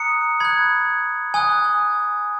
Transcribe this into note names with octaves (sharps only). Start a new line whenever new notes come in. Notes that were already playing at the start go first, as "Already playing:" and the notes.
Already playing: A#5 D#6 F#6 C#7
B5 F#6 G#6
G#5 D#6 F#6